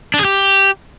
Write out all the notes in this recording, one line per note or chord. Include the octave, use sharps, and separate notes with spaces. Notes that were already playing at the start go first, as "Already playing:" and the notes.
D4
G#4
G4